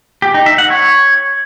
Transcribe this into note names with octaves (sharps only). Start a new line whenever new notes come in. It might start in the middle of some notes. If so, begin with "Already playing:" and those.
G4
D#4
E5
F#5
C#5